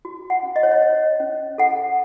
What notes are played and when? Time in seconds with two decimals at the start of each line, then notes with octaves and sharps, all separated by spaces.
0.05 F#4
0.30 F#5
0.43 C#4
0.56 D#5
0.63 C#5
0.71 D#5
0.82 C#5
1.20 C#4
1.58 A4 F#5